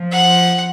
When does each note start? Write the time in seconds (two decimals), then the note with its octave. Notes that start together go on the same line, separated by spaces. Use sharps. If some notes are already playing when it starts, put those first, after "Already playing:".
Already playing: F3
0.12 F#5